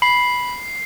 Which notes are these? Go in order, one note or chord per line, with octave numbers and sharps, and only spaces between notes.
B5 C7